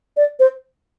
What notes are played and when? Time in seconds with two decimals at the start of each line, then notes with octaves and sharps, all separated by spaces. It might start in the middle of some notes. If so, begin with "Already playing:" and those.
0.17 D5
0.40 C5